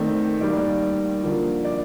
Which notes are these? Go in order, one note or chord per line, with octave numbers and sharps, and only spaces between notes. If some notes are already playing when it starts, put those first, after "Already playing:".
Already playing: D#3 A3 C4 D5
D#3 G3 A#3 D5
D3 F3 A#3
D5